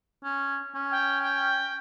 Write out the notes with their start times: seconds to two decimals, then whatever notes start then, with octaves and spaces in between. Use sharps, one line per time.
0.24 C#4
0.75 C#4
0.91 G5
1.22 G5